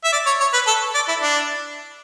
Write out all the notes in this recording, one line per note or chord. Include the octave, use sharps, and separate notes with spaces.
E5
D5
C#5
C#5
B4
A4
D5
E4
D4